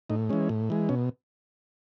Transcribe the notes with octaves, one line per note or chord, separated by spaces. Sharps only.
A2 D#4
E3 G#3 C#4
A2
E3 G#3
B2 C#4